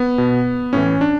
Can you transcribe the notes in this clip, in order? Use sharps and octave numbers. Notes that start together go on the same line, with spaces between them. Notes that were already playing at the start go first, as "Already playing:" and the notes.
Already playing: B3
B2
A2 E3 C#4
D4